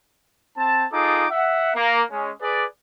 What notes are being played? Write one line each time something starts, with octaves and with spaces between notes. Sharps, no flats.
C4 A5
D#4 F4 G#4 A4 D6
E5 F#5
A#3
G#3 C#4
G#4 B4 D5